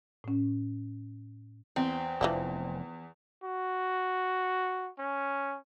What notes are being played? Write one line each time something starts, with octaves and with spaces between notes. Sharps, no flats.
A2 C#4
E2 C4
F1 E3 F3 D4
F#4
C#4